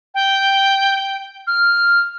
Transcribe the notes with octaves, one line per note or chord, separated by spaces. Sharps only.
G5
F6